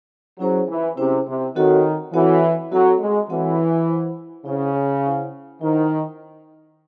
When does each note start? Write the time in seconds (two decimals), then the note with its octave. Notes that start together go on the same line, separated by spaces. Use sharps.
0.39 F#3 C#4 E4 G#4 C5
0.68 E3
0.97 C3 C#4 E4 G#4 C5
1.27 C3
1.56 D#3 C4 F#4 A4 C#5 F#5
2.13 E3 C4 F#4 A4 C#5 F#5
2.71 F#3 C4 F#4 A4 C#5 F#5
3.00 G#3
3.29 E3 C4 F#4 A4 C#5 F#5
3.87 E4 C5 F#5
4.45 C#3 E4 C5 F#5
5.03 E4 C5 F#5
5.61 D#3 E4 C5 F#5